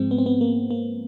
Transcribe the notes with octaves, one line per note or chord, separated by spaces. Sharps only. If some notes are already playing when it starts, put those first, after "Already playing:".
Already playing: G#2 F3 G#3 C4
B3
C4
B3
A#3
A#3